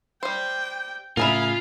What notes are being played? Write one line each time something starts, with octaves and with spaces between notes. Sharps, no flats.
G3 C5 G5
A2 C#3 E4 F4 G#4 A#4 G#5 B5